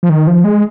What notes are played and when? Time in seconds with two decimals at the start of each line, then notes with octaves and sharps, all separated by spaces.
0.03 F3
0.10 D#3
0.27 F3
0.44 G#3